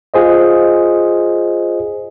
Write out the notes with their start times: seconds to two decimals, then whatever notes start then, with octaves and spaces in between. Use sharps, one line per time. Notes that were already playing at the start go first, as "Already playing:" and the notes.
0.14 F4 G#4 C5 D#5